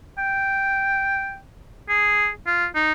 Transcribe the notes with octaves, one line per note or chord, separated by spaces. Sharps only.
G5
G#4
F4
D#4